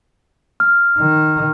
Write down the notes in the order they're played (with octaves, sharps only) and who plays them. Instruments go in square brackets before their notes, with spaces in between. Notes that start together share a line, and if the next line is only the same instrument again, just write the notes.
[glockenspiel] F6
[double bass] D#3